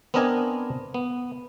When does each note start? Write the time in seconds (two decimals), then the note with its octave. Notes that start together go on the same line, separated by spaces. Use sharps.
0.14 B3 C4 D4 A#4 D#5 G#5
0.94 B3